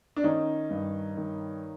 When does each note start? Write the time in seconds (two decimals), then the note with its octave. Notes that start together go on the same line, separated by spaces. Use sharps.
0.16 D4
0.24 D#3 C#4 D#4
0.70 G2
1.17 D#3